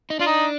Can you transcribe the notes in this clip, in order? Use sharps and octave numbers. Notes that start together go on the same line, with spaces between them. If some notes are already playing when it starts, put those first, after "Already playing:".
D#4
D4 F4
D#4